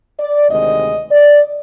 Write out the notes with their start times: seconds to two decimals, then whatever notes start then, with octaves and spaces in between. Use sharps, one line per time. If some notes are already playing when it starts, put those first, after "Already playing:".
0.19 D5
0.50 D2 C3 D#3 G#3 D#5
1.12 D5